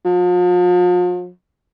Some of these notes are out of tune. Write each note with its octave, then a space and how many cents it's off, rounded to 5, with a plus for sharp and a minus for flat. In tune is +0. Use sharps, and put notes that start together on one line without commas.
F3 +40